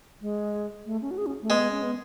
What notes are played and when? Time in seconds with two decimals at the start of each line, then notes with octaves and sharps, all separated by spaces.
0.21 G#3
0.86 A3
1.02 C#4
1.11 F#4
1.18 G#4
1.26 C#4
1.42 A3
1.50 G#3 B3
1.71 C#4
1.83 B3